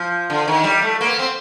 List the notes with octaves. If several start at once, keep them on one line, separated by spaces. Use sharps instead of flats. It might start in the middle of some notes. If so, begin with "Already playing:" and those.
Already playing: F3
D3
D#3
G3
A3
A#3
B3
C4